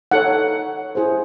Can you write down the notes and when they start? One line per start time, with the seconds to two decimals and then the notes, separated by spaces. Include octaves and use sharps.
0.11 D#4 A4 C#5 F#5
0.95 E4 G#4 C5